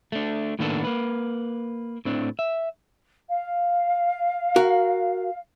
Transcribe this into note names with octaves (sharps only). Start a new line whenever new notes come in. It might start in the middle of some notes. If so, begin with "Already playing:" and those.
A3 D4
A2 D#3 A#3 B3 D4 A4
A#3 B4
A2 C4 D4
E5
F5
F#4 A#4